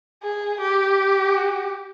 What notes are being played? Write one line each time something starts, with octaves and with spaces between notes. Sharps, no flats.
G#4
G4